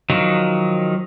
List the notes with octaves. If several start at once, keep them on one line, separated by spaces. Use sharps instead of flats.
D#3 F3 F#3 D#4